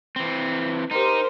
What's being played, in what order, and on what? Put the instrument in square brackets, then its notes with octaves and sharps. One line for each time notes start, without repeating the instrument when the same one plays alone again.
[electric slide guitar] E3 C4
[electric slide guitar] D#4 [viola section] G4 A#4 C5